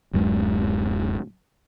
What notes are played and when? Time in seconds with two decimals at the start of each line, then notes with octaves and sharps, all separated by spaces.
0.13 D1 F#2 F#3 G#3